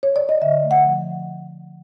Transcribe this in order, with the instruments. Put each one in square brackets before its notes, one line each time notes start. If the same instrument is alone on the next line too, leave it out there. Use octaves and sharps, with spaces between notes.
[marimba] C#5
D5
D#5
D3 E5
A3
F#5
F3